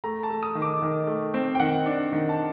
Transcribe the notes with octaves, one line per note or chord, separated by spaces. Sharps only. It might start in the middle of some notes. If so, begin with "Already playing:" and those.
A3 A#5
A5
A3
D#6
D#3
D6
D#3
A3
C4
G5
D#3 F#5
D4
D#3
A5